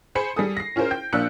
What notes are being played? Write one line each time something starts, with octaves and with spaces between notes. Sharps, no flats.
G#4 C5 G#5 B5 C#7
G3 G#4 A4 D#6
A#6 C7
C#4 F4 G#4 A#4 C5
G5 G6
A#1 A#3 D4 E6 F#6 C#7